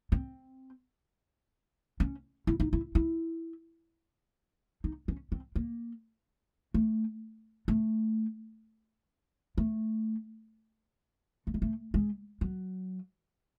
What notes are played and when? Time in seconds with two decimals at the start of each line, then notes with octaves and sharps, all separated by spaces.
0.12 C4
2.00 C#4
2.47 E4
2.60 D#4
2.73 E4
2.95 E4
4.84 D#4
5.08 C#4
5.32 C4
5.56 A#3
6.74 A3
7.68 A3
9.58 A3
11.47 A3
11.54 G#3
11.62 A3
11.94 G#3
12.41 F#3